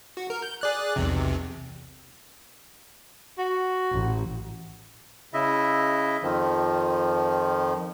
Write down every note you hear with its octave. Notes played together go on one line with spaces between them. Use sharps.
F#4
A#4
G6
G#4 D5 F#6
B1 E2 C3
F#4
A1
C#3 E4 D#5 E5
F2 D#3 F3